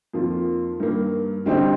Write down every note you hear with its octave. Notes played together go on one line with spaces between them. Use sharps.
F2 D#3 A#3 F4
G2 D#3 A#3
D3 G3 C4 D#4 G4